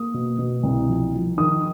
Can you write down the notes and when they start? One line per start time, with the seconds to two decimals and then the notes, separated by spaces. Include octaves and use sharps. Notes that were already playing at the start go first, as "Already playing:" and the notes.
Already playing: A#3 D#6
0.14 B2
0.39 B2
0.63 C2
0.89 F3
1.13 F3
1.38 D#3 D#6